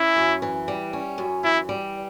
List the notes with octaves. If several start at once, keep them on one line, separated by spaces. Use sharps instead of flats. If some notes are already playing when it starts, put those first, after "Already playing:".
Already playing: C#4 E4
F#2
E3
G3
C#4
F#2
E3 E4
G3